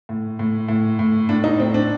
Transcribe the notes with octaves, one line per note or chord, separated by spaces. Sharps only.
A2
A2
A2
A2
A2 D4
D#4
A2 C4
D4